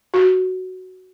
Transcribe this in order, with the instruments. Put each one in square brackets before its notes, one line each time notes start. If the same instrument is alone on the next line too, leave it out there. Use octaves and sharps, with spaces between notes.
[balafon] F#4